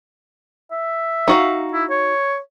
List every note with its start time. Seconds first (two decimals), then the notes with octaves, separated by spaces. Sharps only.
0.71 E5
1.28 D#4 F#4 F5
1.73 E4
1.90 C#5